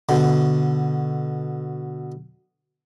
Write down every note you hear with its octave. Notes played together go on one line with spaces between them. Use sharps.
B2 D3